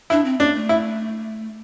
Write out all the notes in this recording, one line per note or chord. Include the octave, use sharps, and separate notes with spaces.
D4 E4
C4
A#3 D4
A3
E4